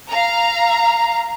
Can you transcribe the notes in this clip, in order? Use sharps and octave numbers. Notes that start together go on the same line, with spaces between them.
F5 A#5